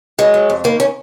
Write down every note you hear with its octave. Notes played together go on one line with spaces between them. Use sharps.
F#3 G#3
F#3
F2
D#3 A#3
C#4